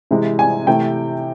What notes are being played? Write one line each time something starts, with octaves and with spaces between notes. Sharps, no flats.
C3 E3 G#3
G#5
C3 E3 A3 G5